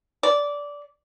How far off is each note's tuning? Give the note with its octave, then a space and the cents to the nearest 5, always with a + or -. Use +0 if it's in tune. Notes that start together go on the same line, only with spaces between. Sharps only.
D5 -15